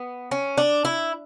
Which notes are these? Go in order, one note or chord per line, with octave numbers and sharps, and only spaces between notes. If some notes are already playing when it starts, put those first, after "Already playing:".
Already playing: B3
C#4
D4
E4